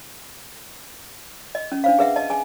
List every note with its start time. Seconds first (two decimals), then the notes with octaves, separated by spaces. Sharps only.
1.55 D#5
1.72 C#4
1.84 D4 C5 F5
1.99 G#4 B4 E5 F#5
2.16 D#5 A5
2.30 G#4 G#5